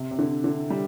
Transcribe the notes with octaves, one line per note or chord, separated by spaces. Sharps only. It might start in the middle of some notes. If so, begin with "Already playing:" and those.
Already playing: C3
C3
D3
D3
G3